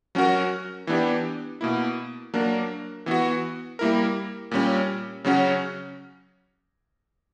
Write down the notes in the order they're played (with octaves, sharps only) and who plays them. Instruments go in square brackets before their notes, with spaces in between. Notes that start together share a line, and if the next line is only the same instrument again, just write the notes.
[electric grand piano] F#3 C#4 F#4 A#4
E3 B3 D4 G4
B2 A#3 E4
F#3 A#3 D4 A#4
E3 B3 F#4
G3 A#3 E4 A#4
A#2 G3 C#4
C#3 F#3 C#4 F#4